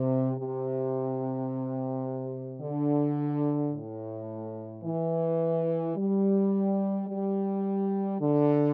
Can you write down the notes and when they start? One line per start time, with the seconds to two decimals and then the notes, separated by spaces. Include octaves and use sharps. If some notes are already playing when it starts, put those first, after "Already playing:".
Already playing: C3
0.37 C3
2.61 D3
3.72 A2
4.84 E3
5.97 G3
7.08 G3
8.20 D3